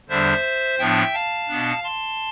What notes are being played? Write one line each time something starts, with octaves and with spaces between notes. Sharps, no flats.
E2 D3 G3 D4 C5 E5
A2 F3 B3 D4 E5 G5
F5 A5
B2 B3 D4
A5 C6